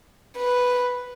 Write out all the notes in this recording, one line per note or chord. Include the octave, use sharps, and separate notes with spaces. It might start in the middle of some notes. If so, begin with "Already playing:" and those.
B4